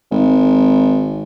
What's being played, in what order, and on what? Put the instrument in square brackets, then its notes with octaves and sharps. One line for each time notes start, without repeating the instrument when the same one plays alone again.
[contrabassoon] G#1